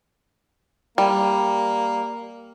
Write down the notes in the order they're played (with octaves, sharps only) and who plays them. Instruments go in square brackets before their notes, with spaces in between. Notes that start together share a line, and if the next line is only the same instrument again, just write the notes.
[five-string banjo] G3 [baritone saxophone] A#3